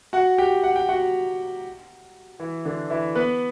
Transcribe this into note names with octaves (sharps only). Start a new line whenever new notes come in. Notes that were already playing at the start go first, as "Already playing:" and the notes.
F#4 F#5
G4 G5
F#5
G5
F#4 F#5
E3 E4
D3 D4
E3 E4
B3 B4